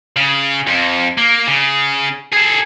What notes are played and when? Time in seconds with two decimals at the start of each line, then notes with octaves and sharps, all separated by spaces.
0.17 C#3
0.67 F2
1.18 A#3
1.47 C#3
2.32 G#4 A4